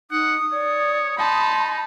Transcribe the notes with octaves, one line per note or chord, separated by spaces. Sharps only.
D#4 F#5 D#6
C#5 D5
D#4 A5 B5 C6